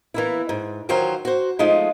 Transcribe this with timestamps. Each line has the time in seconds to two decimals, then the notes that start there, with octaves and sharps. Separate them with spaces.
0.14 E3 A#3 E4
0.49 G#2
0.89 D#3 E3 F#3 F4 C5 G5
1.25 F#4 C5
1.59 F3 G#3 A3 D#4 F4